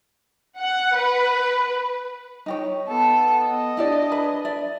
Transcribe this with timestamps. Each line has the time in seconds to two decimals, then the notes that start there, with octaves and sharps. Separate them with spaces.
0.60 F#5
0.97 B4
2.46 D#4 G4 C#5
2.87 B3 A4
3.43 D#5
3.77 D4 E4 G4 D5
4.11 G#4 B4 B5
4.45 D5 E5